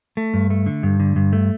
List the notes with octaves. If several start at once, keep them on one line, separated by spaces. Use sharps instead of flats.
A3
G2
A3
D3
G2
D3
G2
A3